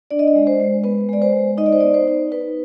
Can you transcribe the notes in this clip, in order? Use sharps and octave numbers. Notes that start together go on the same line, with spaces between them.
D4 D5
D#5
D5
G#3
C5
G#3
B3 B4
G#3 D5
C5
G#3
D#4 D#5
D5
C5
B3 D5
C5
D#4
D#4 B4